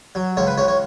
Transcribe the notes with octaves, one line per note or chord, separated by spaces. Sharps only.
F#3
C#2 C#5
B4
C#2 C#5
C#5